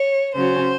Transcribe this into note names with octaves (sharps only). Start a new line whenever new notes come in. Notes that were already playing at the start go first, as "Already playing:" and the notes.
Already playing: C#5
C#3 F#3 C#4 C5